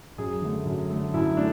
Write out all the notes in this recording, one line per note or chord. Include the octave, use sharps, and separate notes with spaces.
F#2 G#4
D3 A3
F#2
D3 A3
F#2 E4
A3 D4